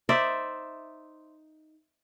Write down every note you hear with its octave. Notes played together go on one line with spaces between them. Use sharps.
D#4 C5 D5 E5